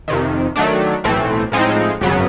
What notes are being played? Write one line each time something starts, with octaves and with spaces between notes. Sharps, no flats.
F2 C3 D#3
D#3 F#3 A3 D4
B1 A2 E3 A3 C4
A2 F3 G#3 C4 D#4
G#1 F#2 C#3 F#3 B3